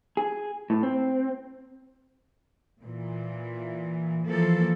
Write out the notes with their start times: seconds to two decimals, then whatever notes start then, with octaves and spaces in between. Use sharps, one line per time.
0.17 G#4
0.70 A2
0.83 C4
2.83 A#2 E3
4.25 E3 F3 A#3 A4